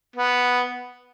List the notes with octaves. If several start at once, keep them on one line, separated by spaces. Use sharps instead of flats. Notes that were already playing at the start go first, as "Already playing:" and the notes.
B3